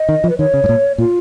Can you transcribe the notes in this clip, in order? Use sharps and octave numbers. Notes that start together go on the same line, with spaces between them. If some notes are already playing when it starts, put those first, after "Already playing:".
Already playing: D#5
D#3
F3
B4
D#3 C#5
C#3
G#2
A#2
A#2 F4